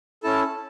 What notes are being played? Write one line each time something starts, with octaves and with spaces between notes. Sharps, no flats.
C#4 E4 A4 A5